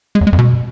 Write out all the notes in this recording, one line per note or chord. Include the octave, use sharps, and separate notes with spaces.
G#3
E2
G#3
F2
B2